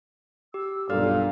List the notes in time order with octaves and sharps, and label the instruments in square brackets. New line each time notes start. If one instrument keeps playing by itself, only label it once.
[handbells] G4 [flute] E6
[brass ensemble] B1 G2 A#2 [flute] A4 [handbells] D5 [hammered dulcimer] F5